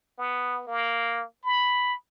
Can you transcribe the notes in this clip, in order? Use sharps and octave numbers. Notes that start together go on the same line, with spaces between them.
B3
A#3
B5